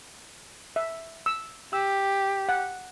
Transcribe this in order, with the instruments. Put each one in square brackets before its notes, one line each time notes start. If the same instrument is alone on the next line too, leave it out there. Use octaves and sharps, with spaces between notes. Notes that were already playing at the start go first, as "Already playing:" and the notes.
[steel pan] E5
E6
[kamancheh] G4 [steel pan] E6
[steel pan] F#5